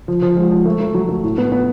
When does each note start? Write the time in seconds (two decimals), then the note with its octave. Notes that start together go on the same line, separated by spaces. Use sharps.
0.08 F3
0.22 F3
0.36 G#3
0.51 F3
0.66 A3
0.80 A3
0.94 F#3
1.09 A3
1.24 A2
1.38 B3
1.52 B3